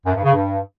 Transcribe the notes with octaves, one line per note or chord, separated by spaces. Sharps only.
F#2
G2
C#3
G2